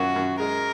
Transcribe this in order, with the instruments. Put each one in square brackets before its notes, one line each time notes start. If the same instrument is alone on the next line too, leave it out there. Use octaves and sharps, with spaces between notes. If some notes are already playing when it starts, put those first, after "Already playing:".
Already playing: [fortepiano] F#2 A#3 F4 [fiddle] F#4
[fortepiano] F#2
[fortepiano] G#3 [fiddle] A#4